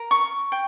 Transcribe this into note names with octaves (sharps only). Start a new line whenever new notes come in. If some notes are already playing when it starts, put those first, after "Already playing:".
Already playing: A#4
C#6
G5